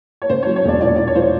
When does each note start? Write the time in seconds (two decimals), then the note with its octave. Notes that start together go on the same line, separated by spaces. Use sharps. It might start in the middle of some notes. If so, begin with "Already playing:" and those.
0.22 C#5
0.29 C#3 C5
0.43 F#3 C#5
0.56 C#5
0.65 E1 D5
0.81 A#2 D5
0.88 C#5
0.96 A#2 D5
1.07 C#5
1.15 F3 C5
1.22 C#5